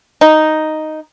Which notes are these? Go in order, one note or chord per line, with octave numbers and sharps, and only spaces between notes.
D#4